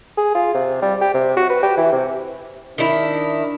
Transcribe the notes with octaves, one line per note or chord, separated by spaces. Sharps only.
G#4
F4
C3
G3
G4
C3
F#4
B4
G4
E3
C3
D#3 D4 E4